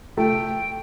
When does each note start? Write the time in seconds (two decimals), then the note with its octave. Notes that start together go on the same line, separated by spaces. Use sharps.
0.17 A3 G5